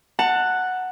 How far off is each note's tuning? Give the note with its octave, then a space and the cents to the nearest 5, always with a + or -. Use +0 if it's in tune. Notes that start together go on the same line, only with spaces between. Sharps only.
F#5 +0 A5 +25